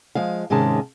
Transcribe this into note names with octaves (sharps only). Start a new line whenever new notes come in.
F3 G#3 F5
G#2 C3 D#3 G#3 C#4 A5